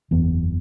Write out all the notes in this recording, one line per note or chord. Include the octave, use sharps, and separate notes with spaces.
F#1 E2 E3 B3